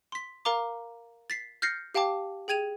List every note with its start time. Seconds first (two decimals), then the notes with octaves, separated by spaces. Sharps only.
0.12 C6 B6
0.45 A#4 F5 A#5 D6
1.30 A6 B6 C7
1.62 F6 G6 A6 A#6 C7 C#7
1.94 G4 F5 G5 A5 D6
2.48 G#4 G5 G#6 D#7 F7